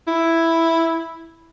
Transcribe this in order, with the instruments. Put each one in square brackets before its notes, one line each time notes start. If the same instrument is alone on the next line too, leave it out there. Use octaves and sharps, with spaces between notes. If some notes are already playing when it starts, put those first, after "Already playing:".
[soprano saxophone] E4